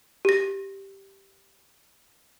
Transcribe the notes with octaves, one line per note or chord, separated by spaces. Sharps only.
G4 A#6